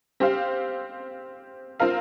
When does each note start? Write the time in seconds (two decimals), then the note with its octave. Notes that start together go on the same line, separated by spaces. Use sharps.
0.20 C4 G4 C5 F5
1.80 C4 F4 A#4 F5